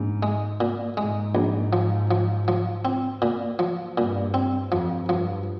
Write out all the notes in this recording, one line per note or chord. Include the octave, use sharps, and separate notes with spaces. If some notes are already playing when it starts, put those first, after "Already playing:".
Already playing: A#1 G#2
G#3
A#2
G#2 G#3
A#1
F3
F3
F3
C4
A#2
F3
G2 A#2
C4
F2 F3
G2 F3